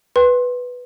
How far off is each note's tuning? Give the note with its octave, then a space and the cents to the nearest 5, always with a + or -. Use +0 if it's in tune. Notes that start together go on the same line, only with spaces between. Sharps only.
B4 +0 G5 +0 C6 +25